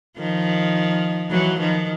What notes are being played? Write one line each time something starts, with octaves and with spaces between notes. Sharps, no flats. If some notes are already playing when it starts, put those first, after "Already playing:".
D#3 F3
E3 F#3
D#3 F3